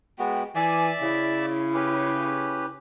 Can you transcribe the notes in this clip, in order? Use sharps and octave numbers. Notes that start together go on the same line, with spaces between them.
G#3 B3 F#4 G5
E3 D5 E5 G#5 D6
C#3 E4
C#4 G4 B4